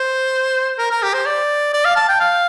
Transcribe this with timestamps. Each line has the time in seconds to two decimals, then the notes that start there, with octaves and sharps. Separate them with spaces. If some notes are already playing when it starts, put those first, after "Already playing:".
Already playing: C5
0.79 A#4
0.91 A#4
1.03 G4
1.14 C5
1.26 D5
1.74 D5
1.85 F5
1.96 A5
2.09 G5
2.21 F5